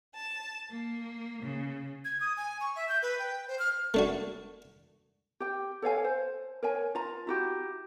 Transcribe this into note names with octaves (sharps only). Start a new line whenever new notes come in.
A5
A#3
C#3
G#6
D#6
G#5
C#6
E5
G6
B4
G5
C5
F6
A3 D4 F#4
G4 G5
A4 C#5 F5 G#5
C5
A#4 C#5 G#5
F4 A#5
E4 F#4 G4